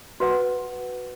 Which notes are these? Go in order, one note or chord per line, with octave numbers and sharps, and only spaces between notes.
F#4 B4 F#5